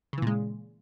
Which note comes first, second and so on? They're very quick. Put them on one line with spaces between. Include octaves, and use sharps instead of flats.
C#3 E3 A#2 G#3